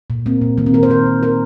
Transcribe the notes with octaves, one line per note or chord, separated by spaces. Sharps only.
A#2
A#3 C4
A#2
D#3 A#3
C4
D#3 A#4
C5
D#3 A#4
D#3
A#3 A#4